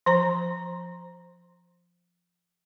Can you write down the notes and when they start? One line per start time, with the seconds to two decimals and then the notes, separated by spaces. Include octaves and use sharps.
0.06 F3 C5 A#5